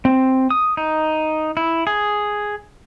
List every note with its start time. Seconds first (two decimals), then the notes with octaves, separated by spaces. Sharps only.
0.05 C4
0.50 D#6
0.77 D#4
1.57 E4
1.87 G#4